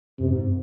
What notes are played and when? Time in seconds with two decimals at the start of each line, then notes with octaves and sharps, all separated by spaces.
0.19 F#2 C3
0.31 G#2